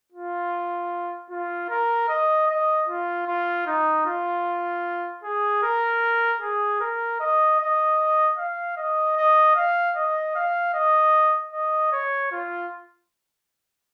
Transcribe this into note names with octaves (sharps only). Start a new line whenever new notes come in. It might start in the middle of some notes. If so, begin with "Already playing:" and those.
F4
F4
A#4
D#5
D#5
F4
F4
D#4
F4
G#4
A#4
G#4
A#4
D#5
D#5
F5
D#5
D#5
F5
D#5
F5
D#5
D#5
C#5
F4